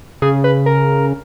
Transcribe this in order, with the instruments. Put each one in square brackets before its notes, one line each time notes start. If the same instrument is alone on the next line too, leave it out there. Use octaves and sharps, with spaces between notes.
[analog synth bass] C#3 [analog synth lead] G#4
[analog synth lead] B4
A#4